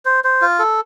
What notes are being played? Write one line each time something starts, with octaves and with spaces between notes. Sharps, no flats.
C5
C5
F4
A4